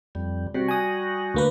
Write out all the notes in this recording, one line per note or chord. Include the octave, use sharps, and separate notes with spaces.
F2 G3
C3 G3 F#4
G#5 D#6
D2 A#3 B4